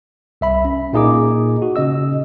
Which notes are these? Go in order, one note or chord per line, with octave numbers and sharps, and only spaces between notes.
C2 E5 B5
C#4
A#2 A#3 D#4 G#4 D#5 D6
F#4
C#3 C#4 D#5 E6